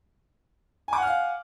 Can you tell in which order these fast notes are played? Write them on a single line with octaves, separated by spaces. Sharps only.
G#5 D6 F#5 F6 F5